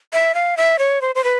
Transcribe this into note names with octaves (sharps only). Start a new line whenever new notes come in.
E5
F5
E5
C#5
C5
C5
B4